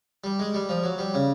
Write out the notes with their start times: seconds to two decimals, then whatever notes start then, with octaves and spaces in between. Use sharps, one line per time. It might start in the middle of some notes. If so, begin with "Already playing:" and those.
0.24 G3
0.39 G#3
0.54 G3
0.69 F3
0.84 F#3
0.98 G3
1.14 C#3